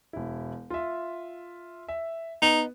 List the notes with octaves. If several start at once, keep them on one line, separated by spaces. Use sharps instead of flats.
E1 E4
F4 E5
E5
B3 D#4